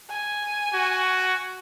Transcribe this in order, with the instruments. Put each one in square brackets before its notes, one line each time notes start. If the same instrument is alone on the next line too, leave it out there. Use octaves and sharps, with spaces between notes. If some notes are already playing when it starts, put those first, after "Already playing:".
[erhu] G#5
[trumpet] F#4